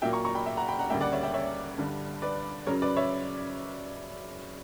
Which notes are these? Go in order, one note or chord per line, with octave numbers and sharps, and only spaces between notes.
A#2 F#3 A#3 E5 G5
A#5 C#6
A#5 C#6
G5 B5
E5 G5
F#5 A#5
G5 B5
F#5 A#5
D2 C#3 G3 A#3 E5 G5
D5 F#5
C#5 E5
E5 G5
C#5 E5
G2 D3 G3
B4 D5
F#2 C#3 F#3 A#4 C#5
B4 D5
C#5 E5